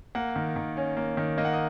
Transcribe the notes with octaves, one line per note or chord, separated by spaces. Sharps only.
A#3 F#5
D#3
D#3
C#4
A#3
D#3
A#3 D#5
F#5
D#5